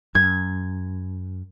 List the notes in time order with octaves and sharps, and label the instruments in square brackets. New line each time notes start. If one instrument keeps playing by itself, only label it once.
[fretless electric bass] F#2 [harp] G#6